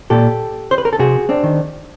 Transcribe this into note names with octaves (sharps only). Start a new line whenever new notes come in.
A#2 G4 A4
C5
B4
A#4
A4
C3 F#4 G#4
C4 D4
D#3